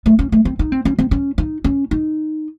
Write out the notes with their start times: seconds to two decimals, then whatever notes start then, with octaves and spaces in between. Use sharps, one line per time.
0.06 A3
0.19 C#4
0.32 A3
0.45 C4
0.59 D#4
0.72 C4
0.85 C#4
0.99 C4
1.11 C#4
1.38 D#4
1.64 C#4
1.91 D#4